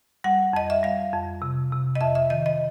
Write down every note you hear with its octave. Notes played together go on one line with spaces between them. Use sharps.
G3 F#5
F2 D#5
E5
G3 F5
F2
C3
C3
D#5
F2 E5
E5
D#3 D#5
D#5